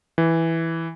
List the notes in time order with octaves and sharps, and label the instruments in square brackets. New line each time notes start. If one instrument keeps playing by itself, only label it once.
[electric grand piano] E3